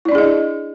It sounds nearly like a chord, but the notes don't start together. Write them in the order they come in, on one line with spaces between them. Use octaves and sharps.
E4 D5 D4 G#4 D#5